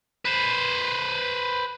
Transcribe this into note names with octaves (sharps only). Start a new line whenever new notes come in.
B4 C5